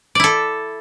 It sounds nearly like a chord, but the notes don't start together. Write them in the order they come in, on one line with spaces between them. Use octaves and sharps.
D5 E4 A4